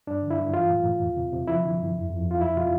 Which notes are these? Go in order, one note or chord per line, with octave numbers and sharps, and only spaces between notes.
G2 D4
D3
E4
G2
E3 F4
A2
A2
E2
C3
C3
F3 E4
D3
G2
F2
F2
F2
F4
F3 E4
C3 F4